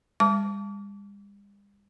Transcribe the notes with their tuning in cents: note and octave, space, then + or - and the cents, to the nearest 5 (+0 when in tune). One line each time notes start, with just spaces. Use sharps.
G3 +45 A5 +0 D6 -40